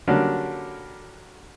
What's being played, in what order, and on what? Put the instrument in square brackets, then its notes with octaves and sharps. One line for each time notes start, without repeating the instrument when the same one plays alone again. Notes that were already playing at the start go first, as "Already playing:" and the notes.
[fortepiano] D3 F#3 G3 A#3 C#4 D4